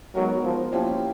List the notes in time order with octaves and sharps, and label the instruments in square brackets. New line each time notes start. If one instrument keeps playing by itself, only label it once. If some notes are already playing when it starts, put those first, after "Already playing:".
[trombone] F#3 [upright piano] G#3 B3 D#4 F#4 A#4
[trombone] F3
[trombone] F3 [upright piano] A#3 C#4 E4 G4